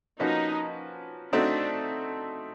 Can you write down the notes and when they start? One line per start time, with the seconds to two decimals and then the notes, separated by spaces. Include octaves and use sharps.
0.20 F3 A#3 C#4 D#4 F#4 B4
1.32 A3 C4 D4 D#4 F#4 A4